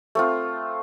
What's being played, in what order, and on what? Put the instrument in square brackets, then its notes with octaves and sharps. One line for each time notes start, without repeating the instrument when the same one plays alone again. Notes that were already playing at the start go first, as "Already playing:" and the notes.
[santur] A3 C4 F4